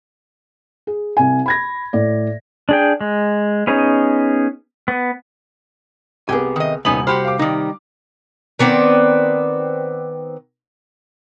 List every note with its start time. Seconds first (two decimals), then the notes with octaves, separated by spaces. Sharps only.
0.87 G#4
1.17 C2 G#5
1.46 B5 G#6 A#6
1.93 A2 D5
2.69 D4 G#4 G5
3.01 G#3
3.67 B3 C#4 D#4 G#4
4.88 B3
6.29 C2 B3 G4 G#4 G#5
6.56 D#3 D#5
6.85 D#1 C2 B3 C#4 D#4 G#5 F#7
7.07 F#4 G4 C5 B5 F6
7.25 F5 D6
7.39 C3 D#3 G3 D#4
8.59 D#3 B3 C4 D5